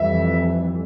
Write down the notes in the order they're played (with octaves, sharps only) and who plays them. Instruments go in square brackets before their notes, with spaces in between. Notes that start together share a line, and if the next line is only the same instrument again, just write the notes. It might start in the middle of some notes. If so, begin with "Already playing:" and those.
Already playing: [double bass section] F2 E3 G3 [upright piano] E5